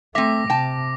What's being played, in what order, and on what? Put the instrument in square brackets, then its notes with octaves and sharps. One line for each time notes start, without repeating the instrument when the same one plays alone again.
[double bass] A3 [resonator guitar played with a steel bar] C4 E5 [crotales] D6 A#6
[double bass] C3 [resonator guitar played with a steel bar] G5 A5